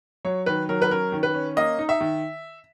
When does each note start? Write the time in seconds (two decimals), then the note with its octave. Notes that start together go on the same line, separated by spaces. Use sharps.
0.25 F#3 C#5
0.46 D#3 B4
0.69 F#3 A#4
0.82 B4
0.91 C#4 A#4
1.12 D#3
1.23 B4
1.34 C#4
1.57 A#3 D#5
1.79 D#4
1.89 E5
2.00 D#3